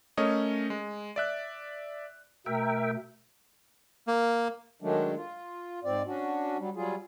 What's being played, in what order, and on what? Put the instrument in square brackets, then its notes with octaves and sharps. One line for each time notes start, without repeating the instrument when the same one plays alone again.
[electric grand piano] A3 C#4 A#4 C#5 D#5
G#3
D5 E5 F#6
[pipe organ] B2 A3 [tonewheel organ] A#4 E5 G5
[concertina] A#3
[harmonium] D#3 F#3 G#3 A3 D4
F4
G#2 C4 D5
C#4 D4 F#4
F#3 G3
F#3 G3 F4 G#4